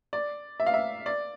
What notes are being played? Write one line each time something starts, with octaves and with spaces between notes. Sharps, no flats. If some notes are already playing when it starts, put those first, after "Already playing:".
D5
E5
F5
E5
D5